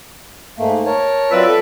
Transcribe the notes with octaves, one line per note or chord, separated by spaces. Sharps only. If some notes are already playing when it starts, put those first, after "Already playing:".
G#2 A3 A#3
A#4 C#5 A5
F#3 C4 F4 B4 D5 E5
A4